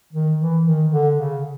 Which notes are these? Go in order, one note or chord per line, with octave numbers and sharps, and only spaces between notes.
D#3
E3
D#3
D3
C#3